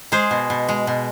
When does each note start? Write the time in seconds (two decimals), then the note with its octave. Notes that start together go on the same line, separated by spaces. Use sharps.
0.12 G#3 G#4 C5
0.31 B2
0.50 B2
0.69 G#3
0.87 B2